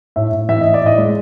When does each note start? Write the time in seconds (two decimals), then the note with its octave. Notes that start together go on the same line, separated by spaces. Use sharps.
0.16 A2 E5
0.32 A2
0.49 E3 E5
0.61 A2 D#5
0.74 D5
0.82 A2 D#5
0.98 G#3